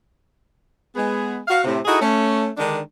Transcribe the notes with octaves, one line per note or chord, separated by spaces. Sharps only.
G#3 B3 G#4
F#4 F5
A2 C3
D#4 E4 F#4 G#4 A4 D#5
A3 C#4
D3 D#3 G#3 D4